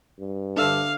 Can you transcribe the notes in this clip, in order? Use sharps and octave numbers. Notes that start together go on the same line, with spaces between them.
G2
D3 D4 A4 E5 F5 E6